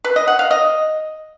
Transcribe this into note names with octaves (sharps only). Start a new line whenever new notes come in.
B4
D#5
F#5
F5
D#5